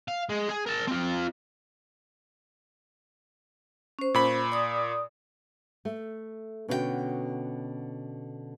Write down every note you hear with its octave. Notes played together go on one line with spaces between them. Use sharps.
F5
G#3
G#4
A#4 A5
C4 F4
C#4 C5
A#2 B5
D5 D#6
A3
B2 D3 C#4 F#4 B4 G5